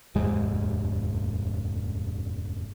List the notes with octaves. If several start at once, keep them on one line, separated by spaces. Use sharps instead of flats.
F1 D#2 G#2 G#3